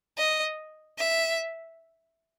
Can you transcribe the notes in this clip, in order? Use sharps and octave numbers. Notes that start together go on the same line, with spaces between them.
D#5
E5